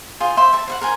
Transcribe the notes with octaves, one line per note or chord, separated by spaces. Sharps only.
F4 G#4 C5
C5 E5 C6
E5 A5
C5 E5 F#5
A#4 C5 G#5